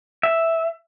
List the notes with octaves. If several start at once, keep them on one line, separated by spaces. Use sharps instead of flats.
E5